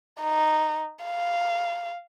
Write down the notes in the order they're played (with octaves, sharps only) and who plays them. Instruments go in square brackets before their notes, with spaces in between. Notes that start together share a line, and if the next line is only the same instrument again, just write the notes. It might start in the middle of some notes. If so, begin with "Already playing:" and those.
[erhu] D#4
F5